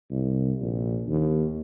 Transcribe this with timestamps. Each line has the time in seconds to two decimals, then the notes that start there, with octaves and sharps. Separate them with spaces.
0.11 C2
0.61 A#1
1.08 D#2